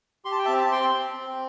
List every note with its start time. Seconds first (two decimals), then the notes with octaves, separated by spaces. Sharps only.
0.25 G4 C6
0.32 A5
0.39 G5
0.45 C4 E5 A5
0.61 A5
0.71 C4 G5 C6
0.94 C4
1.18 C4